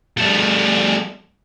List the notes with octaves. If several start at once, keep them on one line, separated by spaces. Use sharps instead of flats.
G3 A3